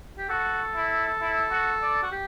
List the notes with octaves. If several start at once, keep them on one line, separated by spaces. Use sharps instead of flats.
G4
F#4 A4
E4
E4
F#4
D5
F#4
G4